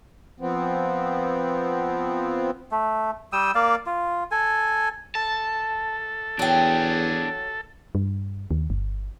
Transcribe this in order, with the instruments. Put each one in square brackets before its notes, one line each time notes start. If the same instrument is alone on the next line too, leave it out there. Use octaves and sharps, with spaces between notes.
[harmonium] F3 B3 C4
[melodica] A3
G3 G5 D#6 E6
A#3 D5 F5
F4
A4 G#5
[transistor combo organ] A4 [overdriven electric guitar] A5
[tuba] E2 [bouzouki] F#3 G5 [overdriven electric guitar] D4 G#4
[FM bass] G2
D#2
G1